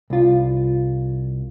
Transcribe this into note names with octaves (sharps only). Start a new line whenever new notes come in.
C2 F4